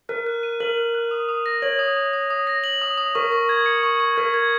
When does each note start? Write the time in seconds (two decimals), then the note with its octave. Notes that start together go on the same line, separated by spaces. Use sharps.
0.09 A#4 F#6
0.27 F#6
0.43 D#7
0.60 A#4 F#7
0.77 F#6
0.95 F#6
1.11 D#6
1.29 D#6
1.46 A#6
1.62 C#5 F#7
1.79 D#6
1.97 D#6
2.13 D#6
2.30 D#6
2.47 A#6
2.64 F#7
2.82 D#6
2.98 D#6
3.15 A#4 C#6
3.32 C#6
3.49 G#6
3.66 C#7
3.83 C#6
4.00 C#6
4.17 A#4 G#6
4.34 G#6